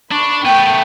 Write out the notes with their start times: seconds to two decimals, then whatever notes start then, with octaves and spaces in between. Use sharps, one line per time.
0.12 D4 B5 C#6
0.45 A3 B3 G5